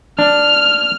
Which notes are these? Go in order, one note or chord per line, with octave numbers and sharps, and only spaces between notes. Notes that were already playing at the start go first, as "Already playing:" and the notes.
D4 F6